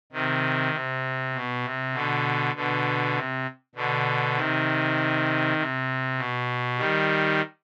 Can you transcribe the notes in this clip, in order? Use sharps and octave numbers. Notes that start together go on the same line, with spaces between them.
C3 D#3
C3
B2
C3
B2 D3
B2 D3
C3
B2 D3
C3 D#3
C3
B2
D#3 G3